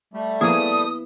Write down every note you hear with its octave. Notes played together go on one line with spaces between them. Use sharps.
G3 A3
F3 A#3 B3 E4 G#4 D#6